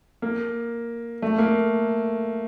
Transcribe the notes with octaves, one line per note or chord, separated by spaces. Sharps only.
A#3
A3
A#3